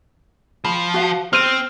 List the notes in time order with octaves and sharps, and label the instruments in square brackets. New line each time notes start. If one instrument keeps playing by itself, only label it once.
[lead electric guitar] F3 [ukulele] B5
[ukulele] F#4 F5
[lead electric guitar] C4 [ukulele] C5 [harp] F6 D#7